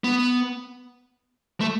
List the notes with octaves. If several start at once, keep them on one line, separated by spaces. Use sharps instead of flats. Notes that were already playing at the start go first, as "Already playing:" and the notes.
B3
A3